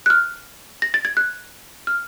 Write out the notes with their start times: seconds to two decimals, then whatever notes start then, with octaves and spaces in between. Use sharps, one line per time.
0.06 F#6
0.10 F6
0.82 A#6
0.94 A6
1.05 G#6
1.17 F#6
1.87 F6